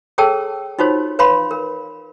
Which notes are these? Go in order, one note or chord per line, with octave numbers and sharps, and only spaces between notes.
G#4 A4 C#5 G5 A5 E6
D#4 F4 F#4 C5 C#5
B4 C#5 F5 B5 C6
A#4